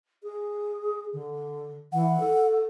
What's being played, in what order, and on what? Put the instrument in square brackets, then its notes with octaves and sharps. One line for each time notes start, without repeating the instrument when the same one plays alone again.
[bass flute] G#4
D3
[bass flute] E3 [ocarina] F#5
[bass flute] A4